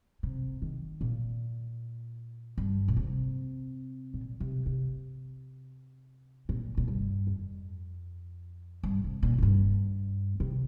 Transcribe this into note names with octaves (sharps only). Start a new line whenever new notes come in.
C3
D#3
A#2
G2
A#2
C3
A#2
C3
C3
A#2
A#2
G2
F2
G2
C3
A#2
A#2
G2
C3